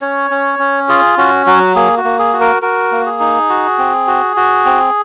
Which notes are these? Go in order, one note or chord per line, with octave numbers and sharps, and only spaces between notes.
C#4 C#5
C#4
C#4
F4 G#4
C#4 F#4
F#3 F#4
A#3 G#4
F#4
A#3
G#4
F#4
A#4
F#4 A#4
A#3
G#4
D#4
F#4
C4
F#4
F#4
C4